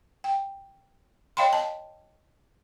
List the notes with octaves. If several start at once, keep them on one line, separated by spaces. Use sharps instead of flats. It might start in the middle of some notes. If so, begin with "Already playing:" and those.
G5
C#5 D#5 F5 G5 B5 C6
D#5 A5